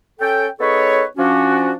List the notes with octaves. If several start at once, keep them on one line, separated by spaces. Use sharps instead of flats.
C#4 A4 G5
B3 D#4 G#4 A4 B4 C#5
F3 C#4 D4 F#4